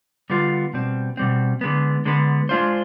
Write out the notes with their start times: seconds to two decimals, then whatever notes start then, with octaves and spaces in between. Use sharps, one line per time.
0.30 D3 G3 B3 F4
0.74 B2 G3 C4
1.17 B2 G3 C4
1.61 D3 G#3 B3
2.05 D3 G#3 B3
2.49 G#3 D4 F4 C5